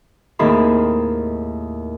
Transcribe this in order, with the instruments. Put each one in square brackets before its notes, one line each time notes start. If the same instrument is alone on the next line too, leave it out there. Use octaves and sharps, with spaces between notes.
[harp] D#2 A2 D#3 C4 G#4 B5